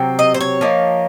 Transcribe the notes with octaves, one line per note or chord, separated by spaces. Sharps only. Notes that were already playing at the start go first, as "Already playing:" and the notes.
Already playing: C3 F#3 C4
D#5
C5
C#5
F3 A#3 D#4